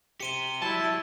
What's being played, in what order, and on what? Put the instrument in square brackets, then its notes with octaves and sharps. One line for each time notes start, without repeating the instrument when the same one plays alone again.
[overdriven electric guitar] G4 C5 [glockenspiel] C#7 D#7 G7
[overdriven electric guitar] F#3 G3 [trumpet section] E4 [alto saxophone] A5